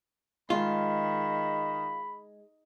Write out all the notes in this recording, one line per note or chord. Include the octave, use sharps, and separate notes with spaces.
D#3 G#3 F4 B5